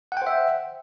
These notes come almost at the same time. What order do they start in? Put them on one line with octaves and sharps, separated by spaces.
F#5 G5 C5 E5